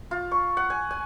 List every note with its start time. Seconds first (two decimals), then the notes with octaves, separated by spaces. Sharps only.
0.11 F4
0.31 C#6
0.57 F#5
0.70 G#5
0.91 G#5